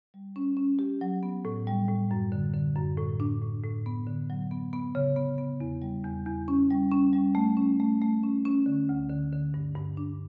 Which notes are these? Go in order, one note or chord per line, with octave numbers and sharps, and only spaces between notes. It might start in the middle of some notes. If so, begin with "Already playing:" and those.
G3
C#4
C#4
G4
F#3
B3
A2
G3
A2
F#2
D3
D3
F#2
A2
D4
A2
A2
B3
D3
F#3
B3
B3
C#3
B3
B3
E2
G3
E2
E2
C#4
G3
C#4
G3
A3
C#4
A3
A3
C#4
C#4
D3
D2
D3
D3
G2
G2
D4